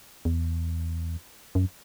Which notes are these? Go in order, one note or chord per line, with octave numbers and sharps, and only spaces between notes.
E2
F#2